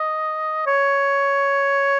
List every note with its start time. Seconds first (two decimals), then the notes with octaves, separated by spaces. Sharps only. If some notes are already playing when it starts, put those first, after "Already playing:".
Already playing: D#5
0.67 C#5